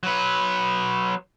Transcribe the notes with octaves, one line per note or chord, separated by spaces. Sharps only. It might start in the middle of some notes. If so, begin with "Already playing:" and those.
F#3 B4